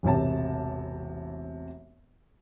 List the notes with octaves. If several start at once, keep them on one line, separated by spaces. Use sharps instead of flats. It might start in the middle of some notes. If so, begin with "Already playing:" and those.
E1 A1 C3 A5